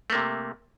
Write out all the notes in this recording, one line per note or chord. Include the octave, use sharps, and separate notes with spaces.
C3 A3 A#3